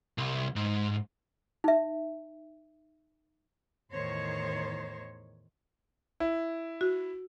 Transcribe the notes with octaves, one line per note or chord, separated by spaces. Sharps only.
C2
G#2
D#4 E5
E2 A2 D#3 C5 C#5
E4
F#4